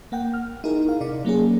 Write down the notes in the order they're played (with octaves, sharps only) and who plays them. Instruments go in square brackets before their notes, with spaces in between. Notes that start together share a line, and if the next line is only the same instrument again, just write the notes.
[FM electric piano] A#3 F#5 G5
F6
D#4 E4 G#4 A#4
F5
C3 D#4 D5
F#3 A#3 C#4 G#4